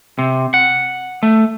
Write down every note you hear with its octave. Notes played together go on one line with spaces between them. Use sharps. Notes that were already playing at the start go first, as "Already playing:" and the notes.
C3
F#5
A3